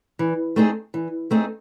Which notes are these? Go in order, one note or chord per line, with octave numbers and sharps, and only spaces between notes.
E3
A3 C4 D#4 G#4
E3
A3 C4 D#4 G#4